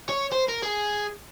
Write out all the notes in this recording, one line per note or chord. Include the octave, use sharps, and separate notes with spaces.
C#5
C5
A#4
G#4